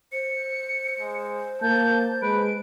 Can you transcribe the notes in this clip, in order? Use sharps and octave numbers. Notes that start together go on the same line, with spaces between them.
C5 C#7
G#3
A#3 A5 G6
G#3 B4 D7